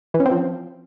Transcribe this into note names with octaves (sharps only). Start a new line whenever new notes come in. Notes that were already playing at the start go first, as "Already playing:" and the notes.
E3
C#4
C4
F3